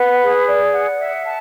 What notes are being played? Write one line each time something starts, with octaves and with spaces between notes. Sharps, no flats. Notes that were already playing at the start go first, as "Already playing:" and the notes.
Already playing: B4 F#5
G#4
D5
F#5
E5
A5